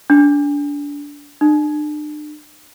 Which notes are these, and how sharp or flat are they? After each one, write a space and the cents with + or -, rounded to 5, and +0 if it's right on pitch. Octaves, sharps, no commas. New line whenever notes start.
D4 -25
D4 +40